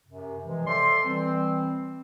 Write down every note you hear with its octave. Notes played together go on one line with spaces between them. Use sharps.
F#2 C3
C3 E3 F3 G#3
A4 C5 D5 E5 C6
E3 G3 C4